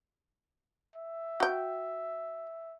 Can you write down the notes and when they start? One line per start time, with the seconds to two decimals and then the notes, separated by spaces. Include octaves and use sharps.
0.96 E5
1.40 F#4 G5